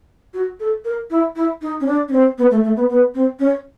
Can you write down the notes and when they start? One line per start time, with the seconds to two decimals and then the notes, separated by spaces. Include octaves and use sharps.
0.34 F#4
0.60 A4
0.85 A#4
1.10 E4
1.36 E4
1.62 D#4
1.80 C#4
1.87 D4
2.08 C#4
2.13 C4
2.38 B3
2.51 A3
2.63 A3
2.76 B3
2.89 B3
3.14 C4
3.39 C#4